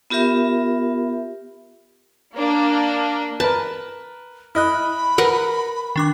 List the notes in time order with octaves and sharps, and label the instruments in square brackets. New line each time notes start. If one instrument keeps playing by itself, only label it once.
[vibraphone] B3 F4 G4 A#4 E5
[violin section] A#3 D4
[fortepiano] A#4 B4 [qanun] A5
[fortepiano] E4 D#5 [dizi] B5 [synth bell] F6 F#6
[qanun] A#4 F#5 [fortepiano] B4
[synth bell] D#3 D4 D6